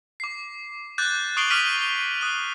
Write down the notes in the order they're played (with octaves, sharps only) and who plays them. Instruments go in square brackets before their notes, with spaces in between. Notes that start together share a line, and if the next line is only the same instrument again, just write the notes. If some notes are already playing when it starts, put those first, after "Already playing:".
[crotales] D6 C7
D6 F#6 G6 A6
C#6 D#6 C7 D7 F#7 G7
D6 D#6 F6 B6 D#7 F#7
D#6 F#6